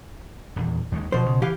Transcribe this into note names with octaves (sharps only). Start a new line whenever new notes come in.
D#1 E2
D#2 D#3 G#3
B2 F3 C5
C#3
E3 G4 F5